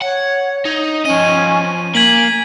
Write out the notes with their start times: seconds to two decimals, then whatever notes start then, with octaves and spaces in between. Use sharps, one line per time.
0.01 C#5 F#5
0.65 D#4
1.05 F3 C#4 D#5 D#7
1.95 A#3 G#5 G#6 B6 F#7